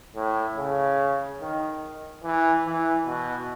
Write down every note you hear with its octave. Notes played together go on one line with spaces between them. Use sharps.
A2
C#3
D#3
E3
E3
B2